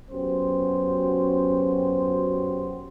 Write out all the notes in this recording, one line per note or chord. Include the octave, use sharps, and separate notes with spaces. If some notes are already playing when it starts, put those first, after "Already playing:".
F#2 B3 C#4 F#4 G4 C5